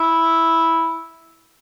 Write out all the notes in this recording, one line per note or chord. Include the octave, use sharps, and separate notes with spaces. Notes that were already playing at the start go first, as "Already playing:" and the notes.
Already playing: E4